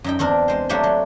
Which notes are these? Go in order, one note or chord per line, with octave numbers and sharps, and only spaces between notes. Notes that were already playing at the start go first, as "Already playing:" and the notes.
F#2 D#4 G5
E2 C4 D4 A#4
G#3 C5
F#3 A3 A#3 D4 G4 C5
F#3